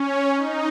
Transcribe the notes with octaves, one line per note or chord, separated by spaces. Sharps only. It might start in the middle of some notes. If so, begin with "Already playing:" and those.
Already playing: C#4
D#4